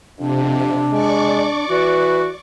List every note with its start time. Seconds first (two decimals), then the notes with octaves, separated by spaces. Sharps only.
0.19 F2 C3 D4
0.92 G#3 D5 C#6 D6
1.70 E3 F#4 B4